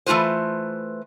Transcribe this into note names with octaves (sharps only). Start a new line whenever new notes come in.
E3 A3 D#4 F4 B4 C5